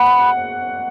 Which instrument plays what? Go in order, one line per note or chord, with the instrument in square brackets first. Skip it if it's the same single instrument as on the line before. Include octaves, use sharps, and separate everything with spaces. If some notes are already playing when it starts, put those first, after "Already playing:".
Already playing: [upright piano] F#5 [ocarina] B5